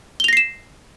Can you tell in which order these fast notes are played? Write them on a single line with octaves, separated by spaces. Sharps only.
G7 F7 A#6 C7 E7